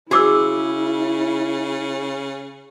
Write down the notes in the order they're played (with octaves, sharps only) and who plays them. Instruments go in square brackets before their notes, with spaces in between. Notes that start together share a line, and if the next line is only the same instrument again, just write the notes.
[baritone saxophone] C#3 [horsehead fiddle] E4 [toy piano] F#4 D6 E6 [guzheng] G#4